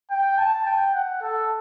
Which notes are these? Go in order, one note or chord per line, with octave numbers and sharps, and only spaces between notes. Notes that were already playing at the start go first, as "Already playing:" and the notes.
G5
A5
G5
F#5
A4